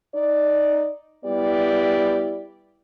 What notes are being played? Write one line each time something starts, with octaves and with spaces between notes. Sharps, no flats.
D#4 D5
G3 B3 E4 G4 D5